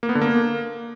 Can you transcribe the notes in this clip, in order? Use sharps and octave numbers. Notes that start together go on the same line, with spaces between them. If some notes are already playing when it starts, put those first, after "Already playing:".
A#3
B3
D3
A#3